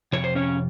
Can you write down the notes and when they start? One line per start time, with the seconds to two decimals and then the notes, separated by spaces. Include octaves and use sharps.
0.13 F2 C3 C#5
0.24 C5
0.35 C#4 C#5